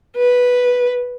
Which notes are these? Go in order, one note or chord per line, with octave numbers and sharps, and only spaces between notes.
B4